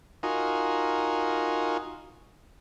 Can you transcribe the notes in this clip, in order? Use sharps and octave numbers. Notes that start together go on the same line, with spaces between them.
D#4 F4 F#4 A#4 G#5